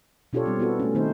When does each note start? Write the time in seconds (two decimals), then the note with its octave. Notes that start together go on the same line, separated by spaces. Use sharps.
0.33 B2 D4 F4 G4 A4 C#5
0.46 G3 C4
0.59 B3 E4 F#4 A4
0.79 A3 C#4
0.94 D#3 A3 C4 D#4 C5